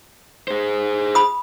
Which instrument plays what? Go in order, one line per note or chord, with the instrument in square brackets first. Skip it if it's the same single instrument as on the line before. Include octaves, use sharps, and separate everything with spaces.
[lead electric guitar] G#4 C5
[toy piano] B5 D#6